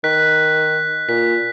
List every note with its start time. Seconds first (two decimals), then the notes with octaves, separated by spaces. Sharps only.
0.04 D#3 F#6 B6
1.09 A#2 B6